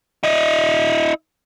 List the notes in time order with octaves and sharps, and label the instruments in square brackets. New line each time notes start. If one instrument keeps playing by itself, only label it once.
[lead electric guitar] E4 D#5